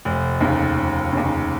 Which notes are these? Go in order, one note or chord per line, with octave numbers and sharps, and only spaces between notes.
F1
D#2 C#3
F1
D#2 C#3